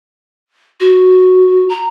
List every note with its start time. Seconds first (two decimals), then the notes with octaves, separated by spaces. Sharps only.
0.80 F#4
1.69 A#5